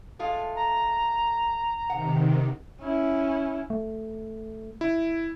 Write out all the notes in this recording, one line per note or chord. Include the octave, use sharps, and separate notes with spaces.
G#3 A3 F4
A#5
C3 D#3 F#5
C#4 E4
A3
E4